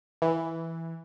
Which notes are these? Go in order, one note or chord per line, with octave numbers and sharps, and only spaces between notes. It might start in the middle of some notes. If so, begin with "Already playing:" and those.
E3